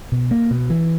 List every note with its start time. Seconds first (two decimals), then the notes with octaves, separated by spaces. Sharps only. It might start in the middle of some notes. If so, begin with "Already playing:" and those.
0.12 B2
0.31 A#3
0.51 B2
0.70 E3